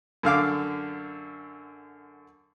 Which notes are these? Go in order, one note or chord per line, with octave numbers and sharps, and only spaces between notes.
F#2 D3 F5 D6